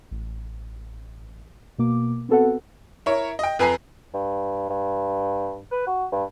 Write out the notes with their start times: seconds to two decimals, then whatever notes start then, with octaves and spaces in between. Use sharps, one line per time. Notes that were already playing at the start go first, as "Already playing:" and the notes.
0.11 A1
1.78 B2 A#3 D6
2.29 B3 C4 F#4 A4 B4 F#5
3.06 E4 A#4 C#5
3.39 D#5 G5
3.59 F2 B4 G#5 A#5 C7
4.14 G2
4.70 G2
5.71 B4
5.87 F#4
6.12 G2